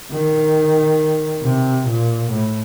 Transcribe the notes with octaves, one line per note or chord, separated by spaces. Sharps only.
D#3
C3
A#2
A2